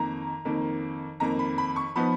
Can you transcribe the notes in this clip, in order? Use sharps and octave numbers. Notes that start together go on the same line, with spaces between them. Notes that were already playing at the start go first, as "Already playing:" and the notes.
Already playing: F2 D#3 A#3 A#5
F2 D#3 A#3
F2 D#3 A#3 A#5
B5
B5
C#6
F3 B3 D#4 B5